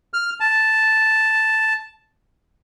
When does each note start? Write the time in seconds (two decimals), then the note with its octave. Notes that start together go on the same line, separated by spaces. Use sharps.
0.14 F6
0.40 A5